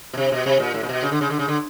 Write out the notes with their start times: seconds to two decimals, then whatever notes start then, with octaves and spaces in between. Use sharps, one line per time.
0.13 B2
0.17 C3
0.32 B2
0.46 C3
0.60 A#2
0.74 A2
0.83 A#2
0.89 B2
1.02 C#3
1.12 D3
1.21 C#3
1.30 D3
1.39 C#3
1.48 D3